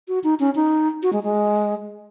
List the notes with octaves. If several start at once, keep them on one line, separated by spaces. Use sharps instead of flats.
F#4
D#4
C#4
D#4
F#4
G#3
G#3